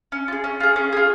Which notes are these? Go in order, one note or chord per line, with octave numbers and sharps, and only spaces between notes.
C#4
F4
G#4
C#4
F4 G#4
C#4
F4 G#4